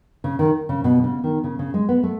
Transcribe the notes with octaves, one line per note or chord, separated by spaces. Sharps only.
C#3
D#3
C#3
B2
C#3
D#3
C#3
C#3
G#3
B3
A3